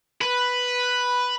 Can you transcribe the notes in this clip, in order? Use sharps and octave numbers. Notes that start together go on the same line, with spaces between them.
B4